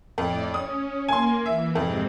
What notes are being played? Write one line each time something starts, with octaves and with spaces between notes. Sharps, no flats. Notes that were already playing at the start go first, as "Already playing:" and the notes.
F2 A2 D5
C#4 D#6
A#3 G#5 C6
E3 E5
F2 G#2 C3 C4